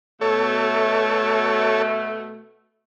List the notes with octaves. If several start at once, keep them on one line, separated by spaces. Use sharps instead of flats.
B2 A3 A4 C#5